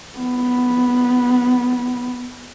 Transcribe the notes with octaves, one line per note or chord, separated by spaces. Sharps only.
B3